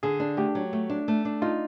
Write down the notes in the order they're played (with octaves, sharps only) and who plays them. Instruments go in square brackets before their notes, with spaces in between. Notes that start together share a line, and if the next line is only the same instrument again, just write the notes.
[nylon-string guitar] D3 [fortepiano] G#4
[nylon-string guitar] D4
[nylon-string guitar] A3 [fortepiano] G4
[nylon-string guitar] F#3
A3
D4
A3
D4
[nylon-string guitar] D#4 [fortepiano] F4